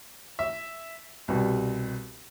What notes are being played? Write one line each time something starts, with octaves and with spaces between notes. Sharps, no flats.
E5
C2 B2 G3